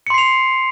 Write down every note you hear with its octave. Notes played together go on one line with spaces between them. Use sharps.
C6 C7 C#7 F7